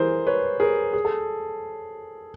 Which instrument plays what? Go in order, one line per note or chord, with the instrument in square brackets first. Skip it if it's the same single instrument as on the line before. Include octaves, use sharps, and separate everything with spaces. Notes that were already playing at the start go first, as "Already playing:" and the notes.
Already playing: [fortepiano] E3 [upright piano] G#4 A#4 C5
[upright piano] B4 C#5
G#4 A#4
G#4
A4